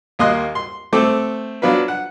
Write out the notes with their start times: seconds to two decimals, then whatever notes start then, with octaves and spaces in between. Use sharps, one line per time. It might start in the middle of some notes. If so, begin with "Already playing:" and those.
0.19 D#2 A#3 D#5 C6 F#6
0.55 C6
0.93 A3 C4 A4 D6
1.62 F#3 B3 D4 F4 B4
1.88 F#5